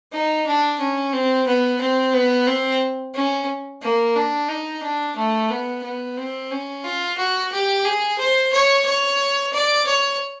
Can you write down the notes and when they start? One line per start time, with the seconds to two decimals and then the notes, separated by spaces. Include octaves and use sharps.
0.13 D#4
0.46 D4
0.80 C#4
1.13 C4
1.47 B3
1.81 C4
2.14 B3
2.47 C4
3.14 C#4
3.82 A#3
4.16 D4
4.49 D#4
4.83 D4
5.16 A3
5.50 B3
5.84 B3
6.17 C4
6.51 C#4
6.84 F4
7.18 F#4
7.52 G4
7.85 G#4
8.19 C5
8.52 C#5
8.85 C#5
9.53 D5
9.87 C#5